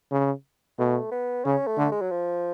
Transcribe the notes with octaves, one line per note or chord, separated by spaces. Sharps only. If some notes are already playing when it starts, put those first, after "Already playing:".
C#3
B2 A3
B3
C#3 C#4
A3
D3
G#3
F#3
F3